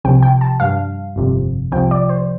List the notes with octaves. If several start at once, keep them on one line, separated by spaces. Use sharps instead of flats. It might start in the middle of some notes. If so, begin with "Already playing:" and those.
C2 C3 F3 G5
G5
A5
G2 G3 F5
G1 F2 C3
C2 C3 F3 G5
D5
C5